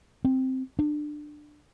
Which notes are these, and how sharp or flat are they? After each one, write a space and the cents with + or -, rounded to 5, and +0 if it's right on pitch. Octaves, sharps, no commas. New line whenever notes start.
C4 +0
D4 +20